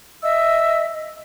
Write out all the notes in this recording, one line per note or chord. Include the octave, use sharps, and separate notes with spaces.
D#5 E5 E6